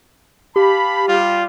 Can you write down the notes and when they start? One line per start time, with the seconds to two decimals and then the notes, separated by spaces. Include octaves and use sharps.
0.56 G4 F5 A5 B5
1.08 G3 F4